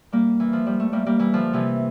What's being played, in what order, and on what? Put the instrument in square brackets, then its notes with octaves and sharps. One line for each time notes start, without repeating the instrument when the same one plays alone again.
[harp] G3 A#3
E3
F3
G3
A3
G3 A#3
G3 A#3
E3 G3
D3 F3
C3 E3